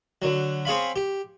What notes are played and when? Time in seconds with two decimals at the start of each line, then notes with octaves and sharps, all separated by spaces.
0.22 D3 F#3
0.65 C4 G#4 C#5 F5 B5
0.96 G4